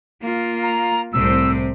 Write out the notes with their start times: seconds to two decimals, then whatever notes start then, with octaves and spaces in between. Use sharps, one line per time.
0.22 A#3 F4
0.63 A#5
1.13 C2 A2 C3 C4 E6